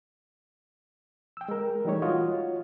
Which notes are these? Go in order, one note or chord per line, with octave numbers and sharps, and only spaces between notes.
G5 E6
G#3 A#4
E3 G3 A3 D#4 G4 C#5
F4 F#4 C#5 D#5